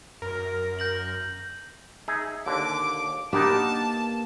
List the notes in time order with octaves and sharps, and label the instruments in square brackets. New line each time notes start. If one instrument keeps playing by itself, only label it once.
[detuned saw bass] F#2 [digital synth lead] A#4
[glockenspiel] G6 A#6 F#7
[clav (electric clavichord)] D#4 G#4 E5
[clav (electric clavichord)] D#2 D3 [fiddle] D6
[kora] A#3 D4 G4 [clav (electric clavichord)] B3 D#4 [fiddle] A5